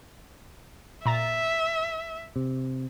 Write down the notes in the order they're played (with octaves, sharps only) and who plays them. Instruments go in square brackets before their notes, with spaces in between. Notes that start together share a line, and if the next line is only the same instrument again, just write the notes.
[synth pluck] A#2 A#5 A6 [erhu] E5
[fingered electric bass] C3